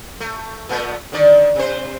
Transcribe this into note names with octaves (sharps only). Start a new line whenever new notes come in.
A3
A#2 A3 B3
D3 D#3 D5
C3 C5